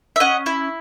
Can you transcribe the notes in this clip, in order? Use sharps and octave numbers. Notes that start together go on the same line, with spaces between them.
E5
C#4 D#5 F#5
E4